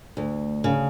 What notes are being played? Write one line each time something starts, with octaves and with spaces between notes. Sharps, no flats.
D2
C#3